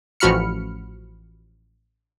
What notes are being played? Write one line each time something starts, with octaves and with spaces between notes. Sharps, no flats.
A1 F3 F#4 B5 F6 C#7